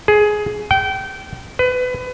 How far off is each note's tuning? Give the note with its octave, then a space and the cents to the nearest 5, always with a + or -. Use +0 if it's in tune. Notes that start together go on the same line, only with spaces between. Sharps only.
G#4 +15
G5 -25
B4 +30